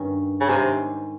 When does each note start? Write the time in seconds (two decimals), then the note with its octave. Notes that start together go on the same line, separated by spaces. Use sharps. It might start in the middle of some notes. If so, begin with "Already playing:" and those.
Already playing: G2 D#3 C#4
0.41 C#3
0.49 G#2 C3 D#3 G#3 C#4 G#4